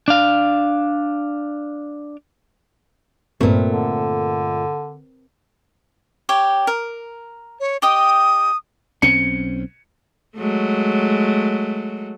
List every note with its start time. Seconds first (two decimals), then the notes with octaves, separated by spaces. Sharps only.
0.08 D4 F5
3.41 G2 A#2 A3 C4 D#4 A#4 B4
3.68 D3
6.29 G4 C#5 G5
6.67 A#4
7.60 C#5
7.82 G4 D#5 G5 D#6
9.02 B1 C4 C#4 C#7
10.36 F#3 G#3 A3